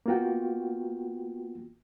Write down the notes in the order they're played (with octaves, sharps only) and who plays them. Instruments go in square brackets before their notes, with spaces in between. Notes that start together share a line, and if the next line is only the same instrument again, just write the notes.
[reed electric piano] A#3 B3 F4 F#4 G5